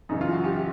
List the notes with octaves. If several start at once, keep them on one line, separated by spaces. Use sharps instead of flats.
F#2 C#3 E3 D#4
F4
F#4
G4
G4